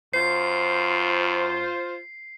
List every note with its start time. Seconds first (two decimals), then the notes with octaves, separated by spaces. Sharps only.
0.14 F#2 F4 C5 C7